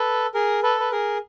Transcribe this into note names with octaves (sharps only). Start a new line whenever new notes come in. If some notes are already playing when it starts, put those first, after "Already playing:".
Already playing: A4 B4
G#4 A#4
A4 B4
B4
G#4 A#4